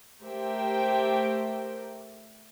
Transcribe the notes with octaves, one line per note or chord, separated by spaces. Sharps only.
A3 G4 A#4 C5 E5 G5